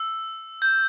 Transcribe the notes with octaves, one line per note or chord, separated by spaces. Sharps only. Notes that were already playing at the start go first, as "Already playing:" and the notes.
Already playing: E6
G6